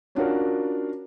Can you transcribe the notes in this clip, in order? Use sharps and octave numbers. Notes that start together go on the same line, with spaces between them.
C#4 D4 F4 F#4 A#4